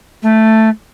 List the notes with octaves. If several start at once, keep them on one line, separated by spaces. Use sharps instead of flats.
A3